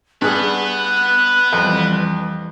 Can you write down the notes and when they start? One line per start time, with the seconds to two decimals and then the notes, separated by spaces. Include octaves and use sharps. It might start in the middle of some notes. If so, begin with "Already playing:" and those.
0.22 G2 G#4 B4 F#5 F#6
1.52 F2 E3 G3